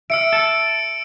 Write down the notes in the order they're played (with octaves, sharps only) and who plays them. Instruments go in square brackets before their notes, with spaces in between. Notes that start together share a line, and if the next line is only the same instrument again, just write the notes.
[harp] E5 F6 [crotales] E6 C#7 D7
[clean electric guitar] A4